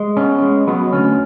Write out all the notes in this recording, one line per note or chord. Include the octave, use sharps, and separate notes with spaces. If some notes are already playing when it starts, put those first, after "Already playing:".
Already playing: G#3
B3 C#4
G#3
F#3 B3
D2 C#4